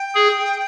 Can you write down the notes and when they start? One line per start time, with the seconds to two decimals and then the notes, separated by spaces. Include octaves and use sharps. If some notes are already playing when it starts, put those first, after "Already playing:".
Already playing: G5
0.15 G#4